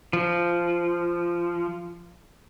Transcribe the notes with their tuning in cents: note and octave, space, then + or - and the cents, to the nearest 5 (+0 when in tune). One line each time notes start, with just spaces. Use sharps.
F3 -15